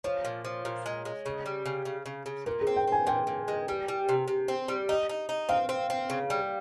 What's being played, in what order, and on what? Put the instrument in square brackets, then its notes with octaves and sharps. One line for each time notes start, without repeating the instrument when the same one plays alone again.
[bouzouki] F3 [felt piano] C#5
[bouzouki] A#2
F3
A#2
G#3
G#3
C#3
G3
C#3
C#3
C#3
C#3
[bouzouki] A#2 [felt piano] A#4
[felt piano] G#4
[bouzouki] C4
[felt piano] G5
[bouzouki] C4 [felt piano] G#5
[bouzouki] A#2 [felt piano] G5
[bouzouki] A#2
G#3
G3
G3
C3
C3
C4
G3
D#4
D#4
D#4
[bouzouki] C4 [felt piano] F5
[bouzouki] C4
C4
C#3
G3